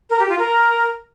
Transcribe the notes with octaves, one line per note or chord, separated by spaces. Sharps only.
A#4
G4
F4
A#4